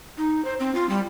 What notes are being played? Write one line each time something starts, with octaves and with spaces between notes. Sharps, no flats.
D#4
C5
C4
F4
G3